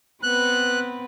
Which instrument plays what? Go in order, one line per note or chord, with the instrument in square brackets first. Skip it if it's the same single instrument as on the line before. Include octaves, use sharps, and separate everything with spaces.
[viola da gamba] B3 C4 B4 [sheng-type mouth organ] F#6